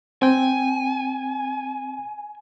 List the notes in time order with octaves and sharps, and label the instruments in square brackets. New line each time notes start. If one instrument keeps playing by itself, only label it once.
[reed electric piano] C4 G5 [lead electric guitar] G#5